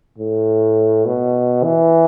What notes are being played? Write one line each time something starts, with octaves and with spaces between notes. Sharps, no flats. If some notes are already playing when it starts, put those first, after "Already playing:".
A2
B2
E3